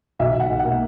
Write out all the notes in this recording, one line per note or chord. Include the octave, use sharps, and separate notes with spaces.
B1 E5
B1 F#5
B1
F#5
A#3